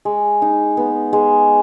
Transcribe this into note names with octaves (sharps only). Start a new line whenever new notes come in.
G#3
D#4
B3
G#3